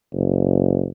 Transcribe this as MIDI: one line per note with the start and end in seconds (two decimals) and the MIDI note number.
0.13 0.87 30